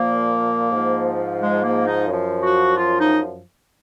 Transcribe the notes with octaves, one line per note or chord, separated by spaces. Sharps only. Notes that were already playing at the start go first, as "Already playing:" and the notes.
Already playing: A#2 F3 A#3
G#2 F3
G#3
A#3
D#4
F#2 F3
F#4
F4
D#4